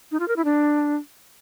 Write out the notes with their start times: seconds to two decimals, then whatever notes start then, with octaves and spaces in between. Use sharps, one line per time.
0.11 D#4
0.20 F4
0.28 A#4
0.36 E4
0.45 D4